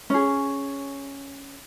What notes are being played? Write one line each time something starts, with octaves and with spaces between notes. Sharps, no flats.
C#4 G#4